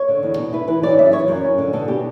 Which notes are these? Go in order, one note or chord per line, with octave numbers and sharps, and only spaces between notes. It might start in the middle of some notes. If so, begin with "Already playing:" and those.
Already playing: C#5
D3
E2
B2
E4 B4
E3 B4
F#3 D5
C#3 E5
E3 C#5
F#2
C#4
D3
B2 A4
B2 G4